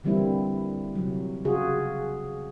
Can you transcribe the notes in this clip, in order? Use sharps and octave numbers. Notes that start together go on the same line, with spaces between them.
D3 E3 G3 A#3 C4 E4
C3 F#3
C#3 F4 F#4 G#4